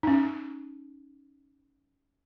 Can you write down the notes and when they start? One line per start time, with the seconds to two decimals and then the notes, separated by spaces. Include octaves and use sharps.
0.03 C#4 D#4